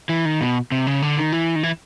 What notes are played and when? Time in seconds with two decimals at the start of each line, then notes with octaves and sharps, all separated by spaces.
0.09 E3
0.25 D#3
0.41 B2
0.72 C3
0.87 C#3
1.02 D3
1.18 D#3
1.32 E3
1.56 D#3
1.63 E3